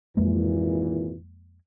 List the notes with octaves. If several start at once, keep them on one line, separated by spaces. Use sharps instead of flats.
G#1 F2 A#2 E3 G#3 A#3